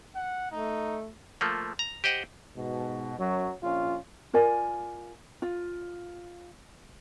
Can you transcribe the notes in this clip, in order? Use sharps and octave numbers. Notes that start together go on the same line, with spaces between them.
F#5
A3 D#4
F3 A3 A#3
A#5
G4 C5 D#5 F#5 G5
G#2 B2
F#2 F#3
A#1 C#4 F4
F4 A#4 D5 G#5
F4